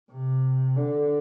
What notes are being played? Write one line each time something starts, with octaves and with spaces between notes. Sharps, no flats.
C3
D3